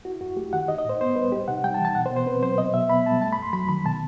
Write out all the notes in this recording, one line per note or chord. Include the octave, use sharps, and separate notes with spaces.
E4 F#4
F#2 F#4
A3 G4
D#3 F#5
D#4 D#5
D#5
A2 C5
B3 C5
G3 B4
D#4 G4
C3 F#5
G3 G5
A5
E3
A5
B2 F#5
C5
B2
C5
C4 B4
F#3 C5
B2 D#5
B2 E5
B3 B5
G3 A5
A3 A5
B5
F#2 C6
F#3 B5
D#3 B5
B2 A5